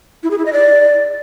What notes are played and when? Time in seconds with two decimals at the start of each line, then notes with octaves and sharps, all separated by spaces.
0.23 E4
0.31 G#4
0.38 E4
0.45 D#5
0.53 D5